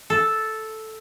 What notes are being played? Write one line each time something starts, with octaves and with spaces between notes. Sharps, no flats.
A4